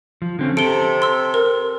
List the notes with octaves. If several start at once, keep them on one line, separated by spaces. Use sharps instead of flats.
F3
D3 C4 C#4
C3 A4 D7 G7
C6 E6
A#4